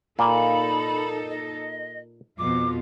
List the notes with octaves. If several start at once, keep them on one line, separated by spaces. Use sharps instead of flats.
A#2 A#3 D#4 A4 B5
D#5
F2 B2 F4 D6